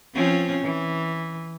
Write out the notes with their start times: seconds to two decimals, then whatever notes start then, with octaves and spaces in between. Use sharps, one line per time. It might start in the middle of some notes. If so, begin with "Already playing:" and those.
0.14 F3 C4 C#4
0.63 E3